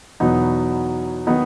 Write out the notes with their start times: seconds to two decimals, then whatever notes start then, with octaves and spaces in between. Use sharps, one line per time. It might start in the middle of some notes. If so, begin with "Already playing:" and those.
0.20 E2 B2 F#3 B3 D#4
1.27 D#3 F#3 B3 D#4